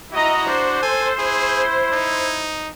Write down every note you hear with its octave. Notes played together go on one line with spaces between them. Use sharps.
E4 F#4 D#5 A#5
D4 C5
A4 G#5
E4 G#4
D#4